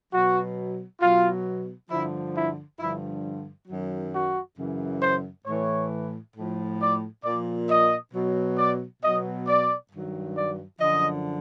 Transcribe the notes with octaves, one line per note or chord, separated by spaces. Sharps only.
B2 F#3 F#4
B2 F#3 F4
G2 D3 F3 E4
E4
G2 D3 F3 E4
F#2 D#3 F#3
F#4
F#2 C#3 E3
C5
A2 E3 C#5
A2 F3
D5
A#2 F3 D5
D#5
B2 F#3
D5
B2 F#3 D#5
D5
G2 D#3 F#3
D5
F#2 D3 F3 D#5